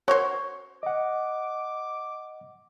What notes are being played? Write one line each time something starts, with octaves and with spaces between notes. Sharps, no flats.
F#4 A#4 C5 C#5
D#5 F#5 D6